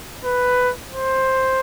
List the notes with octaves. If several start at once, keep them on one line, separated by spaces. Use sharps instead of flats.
B4
C5